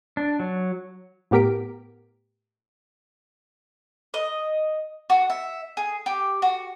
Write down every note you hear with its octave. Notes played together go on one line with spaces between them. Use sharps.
D4
F#3
A2 B3 G4 A#4 B6 D7
D#5
F#4
E5
G#4
G4
F#4